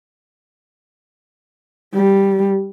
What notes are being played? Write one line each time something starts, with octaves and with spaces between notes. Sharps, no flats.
G3